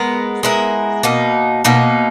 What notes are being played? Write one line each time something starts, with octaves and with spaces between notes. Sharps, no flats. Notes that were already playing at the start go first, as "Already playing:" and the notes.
Already playing: G#3 B3 A#4
G#3 B3 E4 A#4
B2 A#3 D#4
B2 A#3 D#4